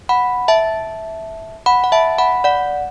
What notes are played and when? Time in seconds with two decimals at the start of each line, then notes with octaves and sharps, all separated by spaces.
0.09 F#5 B5
0.48 E5 A5
1.66 F#5 B5
1.84 F#5
1.92 E5 A5
2.18 F#5 B5
2.44 D5 F#5